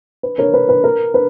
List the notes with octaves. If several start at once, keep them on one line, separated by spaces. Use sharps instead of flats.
B4
A#4 C#5
B4
B4
A#4
B4